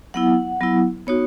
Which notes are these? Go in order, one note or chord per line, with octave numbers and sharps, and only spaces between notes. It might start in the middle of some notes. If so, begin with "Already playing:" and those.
F#3 B3 E4 F#5
F#3 B3 E4
B3 D#4 F#4 C#5